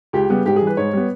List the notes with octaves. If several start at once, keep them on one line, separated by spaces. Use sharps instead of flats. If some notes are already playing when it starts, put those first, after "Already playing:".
C#2 G4
C#3 G3 B3
G#2 G4
G#4
E3 G3
B4
G#2 C#5
G3 B3